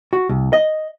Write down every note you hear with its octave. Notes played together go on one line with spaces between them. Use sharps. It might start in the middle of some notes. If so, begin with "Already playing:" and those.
F#4
C2
D#5